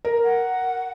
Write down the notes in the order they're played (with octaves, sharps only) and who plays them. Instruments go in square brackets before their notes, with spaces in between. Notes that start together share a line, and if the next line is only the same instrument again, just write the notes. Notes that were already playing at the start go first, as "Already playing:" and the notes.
[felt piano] A#4
[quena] F#5